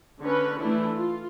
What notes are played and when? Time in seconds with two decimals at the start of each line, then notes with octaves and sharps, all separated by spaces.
0.20 D3 C#4 B4
0.60 E3 A3 D4 E4
0.94 F4